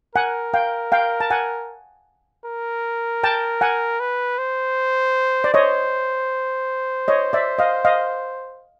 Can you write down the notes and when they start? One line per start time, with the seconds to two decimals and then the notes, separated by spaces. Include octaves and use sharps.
0.15 A#4 F#5 G#5
0.54 F5 G5
0.92 F5 G5
1.20 A5
1.31 F#5 G#5
2.46 A#4
3.23 G5 A5
3.61 F#5 G#5
4.00 B4
4.38 C5
5.44 D5
5.54 C5 C#5 D#5
7.08 C#5 D#5
7.33 D5 E5
7.59 D#5 F5
7.85 D#5 F5